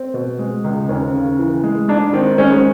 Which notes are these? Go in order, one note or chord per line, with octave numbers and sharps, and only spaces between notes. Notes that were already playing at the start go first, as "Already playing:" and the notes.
Already playing: C4
B2
G#3
C#2
D#2 C#4
C#3
E3
G#3
G#2 D4
D#3 C4
G#3 C#4